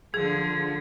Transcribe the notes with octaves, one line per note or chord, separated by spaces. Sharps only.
D3 F3 G#4 G#6